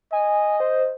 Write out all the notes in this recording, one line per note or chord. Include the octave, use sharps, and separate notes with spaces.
D#5 G#5
C5